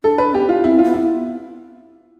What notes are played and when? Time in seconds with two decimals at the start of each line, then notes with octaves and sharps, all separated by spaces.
0.04 D4 A4
0.18 B4
0.34 B3 G4
0.49 F4
0.64 C4 E4
0.79 F4
0.84 B3
0.94 E4